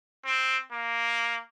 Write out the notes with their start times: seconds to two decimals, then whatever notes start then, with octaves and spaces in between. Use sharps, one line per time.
0.25 C4
0.72 A#3